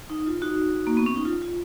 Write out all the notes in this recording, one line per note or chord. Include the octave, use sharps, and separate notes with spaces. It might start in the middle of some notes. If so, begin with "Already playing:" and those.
D#4
F4
D#4 F#4
A#3
B3
C#4
D#4
F4
F4